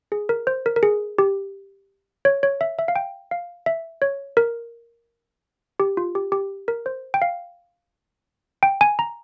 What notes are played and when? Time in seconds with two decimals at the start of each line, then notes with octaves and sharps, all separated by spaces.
0.12 G#4
0.29 A#4
0.47 C5
0.66 A#4
0.76 A#4
0.83 G#4
1.18 G4
2.25 C#5
2.43 C#5
2.61 E5
2.79 E5
2.88 F5
2.96 G5
3.31 F5
3.66 E5
4.02 C#5
4.37 A#4
5.80 G4
5.97 F4
6.15 G4
6.32 G4
6.68 A#4
6.86 C5
7.14 G5
7.22 F5
8.63 G5
8.81 G#5
8.99 A#5